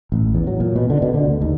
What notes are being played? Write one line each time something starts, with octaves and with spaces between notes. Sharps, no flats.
A1
E2
F#3
A#2
B2
D3
B2
D3
D2
D#2